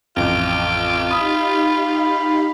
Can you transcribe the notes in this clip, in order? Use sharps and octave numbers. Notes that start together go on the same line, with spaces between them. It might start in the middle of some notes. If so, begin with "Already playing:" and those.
A1 F2 F4 E6 D7
D#4 G4 F5 B5 D#6